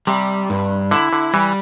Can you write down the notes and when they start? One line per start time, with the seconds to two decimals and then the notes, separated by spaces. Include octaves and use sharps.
0.07 C3 G3
0.50 G2
0.91 D3 E4
1.13 D3
1.33 E3 G3